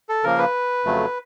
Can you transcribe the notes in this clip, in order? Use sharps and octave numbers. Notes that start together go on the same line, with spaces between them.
A4
C#3 F3 A#3 A#4
B4
F2 C#3 F#3 A3